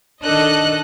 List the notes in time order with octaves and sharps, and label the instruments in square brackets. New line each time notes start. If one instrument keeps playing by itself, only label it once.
[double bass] D#3 D4 [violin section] A4 D#5 F#6